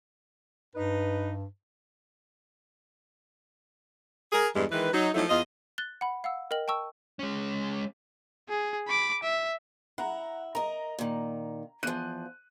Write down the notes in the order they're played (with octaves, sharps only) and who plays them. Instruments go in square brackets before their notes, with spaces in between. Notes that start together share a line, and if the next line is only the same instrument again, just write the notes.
[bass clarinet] G2 [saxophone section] D#4 B4
[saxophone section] G#4 A#4
E2 G2 G#3
D#3 E3 G#3 B4
F#3 D#4
F3 F#3 A3 D#4 E4
E2 F4 D#5
[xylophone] F#6 A6 G7
F#5 B5
F5 F#5 E6
A#4 D#5 G5 F#7
G5 A5 C#6 E6
[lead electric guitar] G#3 C#4
[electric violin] G#4
B5 D6
E5
[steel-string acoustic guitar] E4 [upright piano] F#5 A#5
[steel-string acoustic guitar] A#4 D#5 [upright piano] A#5
[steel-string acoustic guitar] A#2 D#3
[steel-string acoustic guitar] E2 F3 [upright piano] F#6 D#7